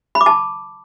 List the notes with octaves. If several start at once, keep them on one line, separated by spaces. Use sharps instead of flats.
B5
D6
A5